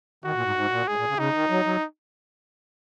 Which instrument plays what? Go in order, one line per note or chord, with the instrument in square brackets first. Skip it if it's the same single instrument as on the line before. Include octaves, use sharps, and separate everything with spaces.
[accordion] D#3 [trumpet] F#4
[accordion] A#2
G#2
G#2
A#2
[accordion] G#2 [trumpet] G#4
[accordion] A#2
C#3
[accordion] C#3 [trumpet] D#4
[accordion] D#3
F#3
F#3